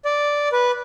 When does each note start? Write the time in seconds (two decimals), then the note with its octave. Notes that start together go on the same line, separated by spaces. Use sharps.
0.05 D5
0.52 B4